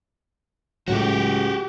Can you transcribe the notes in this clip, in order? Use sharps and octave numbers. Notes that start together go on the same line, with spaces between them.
C#2 A2 F#3 F#4 G4